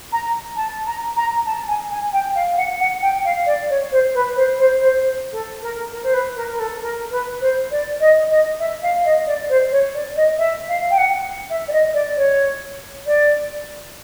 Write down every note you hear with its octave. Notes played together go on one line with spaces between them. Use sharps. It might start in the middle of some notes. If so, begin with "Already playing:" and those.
A#5
A5
A#5
A#5
A5
G#5
G#5
G5
F5
F#5
F#5
G5
F5
D5
C#5
C5
B4
C5
C5
C5
C5
A4
A#4
A#4
C5
B4
A#4
A#4
A4
A#4
B4
C5
D5
D#5
D#5
E5
F5
D#5
D5
C5
C#5
D5
D#5
E5
F5
G5
F#5
E5
D5
D#5
D5
C#5
D5